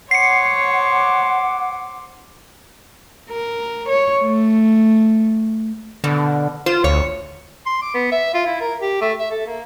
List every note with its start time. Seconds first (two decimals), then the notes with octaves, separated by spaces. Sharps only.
0.11 C5 C#5 F#5 D6 C7 C#7
3.30 A#4
3.89 C#5
4.23 A3
6.04 B2 D3
6.66 F4 C5
6.84 D2 C#5
7.66 C6
7.82 D6
7.94 B3
8.12 E5
8.34 F4
8.46 E4
8.61 A#4
8.81 G4
9.01 A3
9.19 E5
9.31 A4
9.47 A#3